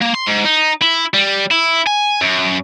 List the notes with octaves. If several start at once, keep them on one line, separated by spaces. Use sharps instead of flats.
A#3
C6
G#2
D#4
E4
G3
E4
G#5
F#2